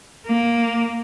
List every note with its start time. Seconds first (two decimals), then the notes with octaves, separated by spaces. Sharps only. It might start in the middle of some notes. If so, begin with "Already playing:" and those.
0.26 A#3